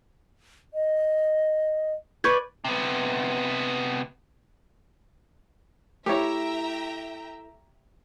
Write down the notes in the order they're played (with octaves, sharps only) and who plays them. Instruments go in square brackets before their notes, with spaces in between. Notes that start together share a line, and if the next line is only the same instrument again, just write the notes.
[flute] D#5
[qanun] B4 D5 [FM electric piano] C#6 G6 G#6
[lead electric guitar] C3 B3
[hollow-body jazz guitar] A3 E4 [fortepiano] G4 C#5 [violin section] E5 G5 A#5